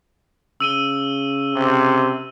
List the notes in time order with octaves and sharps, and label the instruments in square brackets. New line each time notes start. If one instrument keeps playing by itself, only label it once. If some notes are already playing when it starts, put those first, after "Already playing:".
[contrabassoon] C#3 [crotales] E6 D#7 G7
[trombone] C3